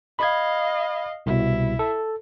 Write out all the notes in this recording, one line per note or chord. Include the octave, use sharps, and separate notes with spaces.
D#5 F5 B5 G#6
C2 B2 E4
A4